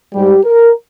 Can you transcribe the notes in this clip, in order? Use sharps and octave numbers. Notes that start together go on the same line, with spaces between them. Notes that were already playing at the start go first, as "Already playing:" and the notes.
G#2 G3 G4
A#4